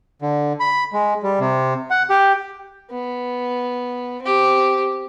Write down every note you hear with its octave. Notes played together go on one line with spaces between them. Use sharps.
D3
B5
G#3
G3
C3
F#5
G4
B3
C4 G4